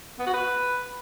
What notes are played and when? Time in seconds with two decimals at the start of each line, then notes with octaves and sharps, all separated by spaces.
0.19 B3
0.27 F#4
0.34 B4